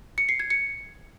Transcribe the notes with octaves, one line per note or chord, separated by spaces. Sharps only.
C#7
C7
G#6
C#7